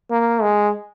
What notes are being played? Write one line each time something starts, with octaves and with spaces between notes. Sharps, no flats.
A#3
G#3